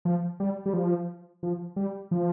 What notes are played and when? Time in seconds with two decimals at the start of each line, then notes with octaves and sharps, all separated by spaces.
0.05 F3
0.40 G3
0.66 G3
0.73 F3
1.43 F3
1.76 G3
2.11 F3